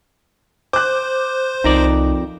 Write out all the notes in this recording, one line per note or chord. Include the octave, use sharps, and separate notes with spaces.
C5 D6 F#6
C2 F2 D#4 A#4 D5